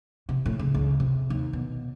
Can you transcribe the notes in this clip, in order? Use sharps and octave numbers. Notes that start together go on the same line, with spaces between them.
C3
A2
C#3
C#2
C3
D#2
B2